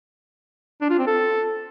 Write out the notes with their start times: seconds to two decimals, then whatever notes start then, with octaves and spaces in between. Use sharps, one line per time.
0.81 D4
0.90 F4
0.98 C4
1.07 A4